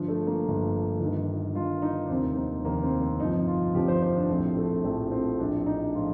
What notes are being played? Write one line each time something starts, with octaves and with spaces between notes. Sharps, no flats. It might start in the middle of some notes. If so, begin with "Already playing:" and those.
Already playing: G1 G2 F3
A3
A#3
G1 G2 F3
G1 G2 D#3
G1 G2 D#3 F4
D#4
D4
F1 D#2 D#3 C4
A#3
F1 D#2 D#3 A#3
C4
C4
G1 F2 C3 F3 D#4
F4
G1 F2 C3 F3 G4
C5
C5
D4
A#1 A2 F3 C4
A3
A#1 A2 F3 A3
C4
A#1 A2 F3 D4
D4
D#4
A2 F3 F4